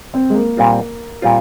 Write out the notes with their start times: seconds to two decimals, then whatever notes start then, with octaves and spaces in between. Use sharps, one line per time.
0.14 C4
0.30 G#3
0.35 A#3
0.57 A#2 G3 C4 F4
1.22 A#2 G3 C4 F4